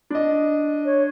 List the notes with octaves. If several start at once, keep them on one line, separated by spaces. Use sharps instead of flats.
D4 D#5
C#5